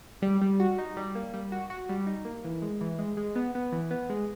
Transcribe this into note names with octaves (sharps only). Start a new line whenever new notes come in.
G3
G3
F#4
D#4
G3
A#3
G3
F#4
F#4
G3
D#4
A#3
E3
G#3
E3
G#3
G#3
B3
B3
E3
B3
G#3